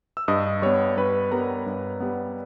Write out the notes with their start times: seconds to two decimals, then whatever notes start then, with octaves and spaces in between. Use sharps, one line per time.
0.17 E6
0.28 G2 D#5 D#6
0.62 G3 B3 C#5 C#6
0.97 G2 B4 B5
1.32 G3 B3 A#4 A#5
1.66 G2
2.00 G3 B3